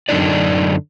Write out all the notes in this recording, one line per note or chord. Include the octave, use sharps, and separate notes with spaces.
F#2 D3 D#3 D4 D#4 D5